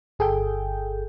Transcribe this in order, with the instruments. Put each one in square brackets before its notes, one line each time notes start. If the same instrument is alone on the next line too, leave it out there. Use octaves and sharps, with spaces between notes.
[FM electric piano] G1 G#4 A4 G5 G6